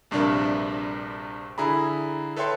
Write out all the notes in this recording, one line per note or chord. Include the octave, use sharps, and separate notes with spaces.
A#1 G2 C3 D4 A#4 E5
D3 E4 G#4 A#5 B5
A4 B4 C#5 E5 G5 C6